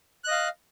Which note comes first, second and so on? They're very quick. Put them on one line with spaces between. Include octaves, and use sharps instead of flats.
F#6 D#5 F5